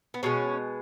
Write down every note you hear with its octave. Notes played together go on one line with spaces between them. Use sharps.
B3
B2 G#3 C#4